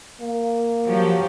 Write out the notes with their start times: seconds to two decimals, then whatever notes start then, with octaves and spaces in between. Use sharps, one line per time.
0.20 A#3
0.88 F3 F#3 G4